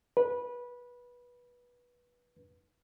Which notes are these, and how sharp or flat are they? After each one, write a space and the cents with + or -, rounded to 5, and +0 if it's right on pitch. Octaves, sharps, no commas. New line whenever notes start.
B4 -20